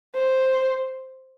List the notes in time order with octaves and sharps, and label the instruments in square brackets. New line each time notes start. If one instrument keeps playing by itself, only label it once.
[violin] C5